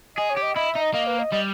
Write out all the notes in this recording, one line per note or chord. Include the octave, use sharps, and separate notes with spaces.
G#4 D#5
C#5
G4
D#5
E4 D#5
E5
D#4
D#5
A#3 D#5
B4
D#5
G3 D#5